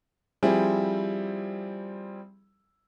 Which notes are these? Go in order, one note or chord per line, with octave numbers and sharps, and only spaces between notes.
F3 G3 C4 E4 G#4